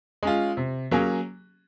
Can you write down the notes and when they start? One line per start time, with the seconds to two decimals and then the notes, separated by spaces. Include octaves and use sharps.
0.23 G#3 C#4 F4
0.57 C3
0.91 F#3 A#3 C#4 G#4